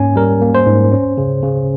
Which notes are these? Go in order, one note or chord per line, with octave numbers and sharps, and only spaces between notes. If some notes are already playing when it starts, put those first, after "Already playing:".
Already playing: G#2 A#3 C#4 G#5
G3 A#4
A#3
C5
G#2
C#4
C#3
C#3